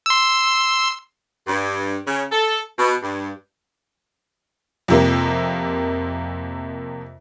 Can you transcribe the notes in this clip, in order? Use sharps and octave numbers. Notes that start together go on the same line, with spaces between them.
C6 E6
G2
C#3
A4
B2
G2
F2 C3 A#3